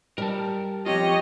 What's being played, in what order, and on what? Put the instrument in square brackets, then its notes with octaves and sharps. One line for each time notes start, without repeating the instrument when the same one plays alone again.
[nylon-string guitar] G3 [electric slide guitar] A#4 A5
[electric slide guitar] F3 C4 F4 [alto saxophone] G4 [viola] C#5 D#5